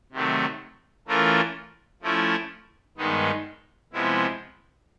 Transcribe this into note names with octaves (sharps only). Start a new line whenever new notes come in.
C3 D#3 F#3 A3
E3 A3 C#4 F4 A#4
F3 A3 C#4 E4
G2 D#3 G#3 B3 D#4
C3 F3 G#3 B3 E4